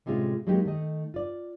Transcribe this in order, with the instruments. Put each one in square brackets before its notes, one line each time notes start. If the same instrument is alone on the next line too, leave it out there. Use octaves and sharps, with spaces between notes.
[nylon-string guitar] A2 C3 G#3 C#4 F4
F#3 G#3 A#3 D#4 G4
D#3 A3 D#5
F4 D5